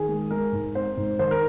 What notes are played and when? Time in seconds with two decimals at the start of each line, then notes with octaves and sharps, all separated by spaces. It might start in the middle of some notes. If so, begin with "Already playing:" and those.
Already playing: D#3 G#4
0.08 G#3
0.31 G#3 A#4
0.52 G#2
0.75 C4 C5
0.97 G#2
1.19 D#3 C5
1.31 A#4